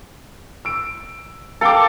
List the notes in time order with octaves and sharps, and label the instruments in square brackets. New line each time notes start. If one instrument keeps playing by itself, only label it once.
[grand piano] E6 D7
[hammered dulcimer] A4 D6 [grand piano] A#4 F5 G5